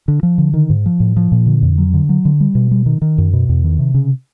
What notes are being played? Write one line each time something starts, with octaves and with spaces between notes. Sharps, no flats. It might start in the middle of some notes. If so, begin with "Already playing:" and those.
D3
F3
D3
D#3
G#2
F3
A2
F3
A#2
D3
F2
F#3
D3
F#3
D3
G3
B2
G3
D#3
D#3
F#2
B2
E2
D#3
C3
C#3